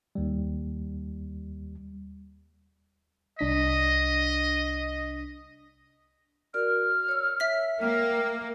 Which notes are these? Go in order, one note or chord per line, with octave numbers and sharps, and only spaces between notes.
D#2 G3
C2 D4 D#5 B6
F#4 A#4 D5 F6
C#5 E6
E5 B6
A#3 G5 F6